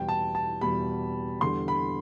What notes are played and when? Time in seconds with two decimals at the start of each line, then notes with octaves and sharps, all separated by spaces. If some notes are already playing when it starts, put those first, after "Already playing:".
Already playing: E2 B2 G3 G5
0.09 A5
0.35 A5
0.61 E2 B2 G3 B5
1.41 E2 D3 G3 C6
1.68 B5